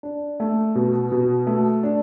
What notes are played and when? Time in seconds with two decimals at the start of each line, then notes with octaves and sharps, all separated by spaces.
0.03 D4
0.40 A3
0.75 B2
1.12 B2
1.47 A3
1.83 D4